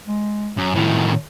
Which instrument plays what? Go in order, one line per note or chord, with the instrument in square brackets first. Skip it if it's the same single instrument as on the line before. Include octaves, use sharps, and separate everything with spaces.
[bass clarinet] G#3
[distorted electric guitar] F#2
[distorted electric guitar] A2 D#3 [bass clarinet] E4